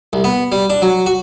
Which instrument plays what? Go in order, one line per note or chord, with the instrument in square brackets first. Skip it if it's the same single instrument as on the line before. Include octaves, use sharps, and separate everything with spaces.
[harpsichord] C2
B3
G3
D4
F#3
F#4